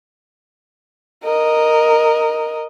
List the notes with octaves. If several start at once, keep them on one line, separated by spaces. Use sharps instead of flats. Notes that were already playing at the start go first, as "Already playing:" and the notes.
A#4 D#5